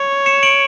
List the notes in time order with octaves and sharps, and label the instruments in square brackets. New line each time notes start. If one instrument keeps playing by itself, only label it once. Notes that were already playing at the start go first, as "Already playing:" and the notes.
Already playing: [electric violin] C#5
[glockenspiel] C#7 E7
D7 F#7